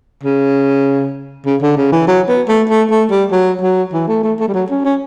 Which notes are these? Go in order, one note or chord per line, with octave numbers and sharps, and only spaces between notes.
C#3
C#3
D3
C#3
E3
F#3
B3
A3
A3
A3
G3
F#3
F#3
E3
A3
A3
A3
G3
F#3
C#4
C#4